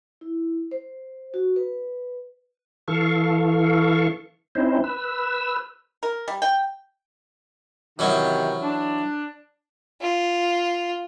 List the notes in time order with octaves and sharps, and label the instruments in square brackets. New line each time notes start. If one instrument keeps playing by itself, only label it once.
[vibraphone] E4
C5
F#4
B4
[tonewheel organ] E3 A4 F5 C#6
C4 C#4 D#4 E4 C5
B4 E6
[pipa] A#4
G3
G5
[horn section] C3 D#3 [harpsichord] E3 F#3 C#4
[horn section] D4
[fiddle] F4